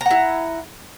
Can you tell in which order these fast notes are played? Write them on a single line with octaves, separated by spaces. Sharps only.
A#5 F#5 E4